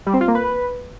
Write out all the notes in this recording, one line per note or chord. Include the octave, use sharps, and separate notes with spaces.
G3
C4
F4
A#3
B4